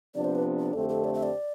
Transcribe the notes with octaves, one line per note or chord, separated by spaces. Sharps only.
C3 F3 B3 D4 D5
C5
B4
D5
F2 D3 A3 C4 G4 A4
A4
D5
E5
D5